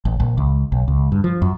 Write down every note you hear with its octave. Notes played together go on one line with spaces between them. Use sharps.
A1
A#1
C#2
B1
C#2
G2
F3
F#2